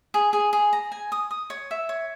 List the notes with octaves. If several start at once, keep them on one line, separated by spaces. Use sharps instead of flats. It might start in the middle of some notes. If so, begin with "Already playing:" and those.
G#4
G#4
G#4
A#5
G#5
D#6
D#6
C#5
E5
C#5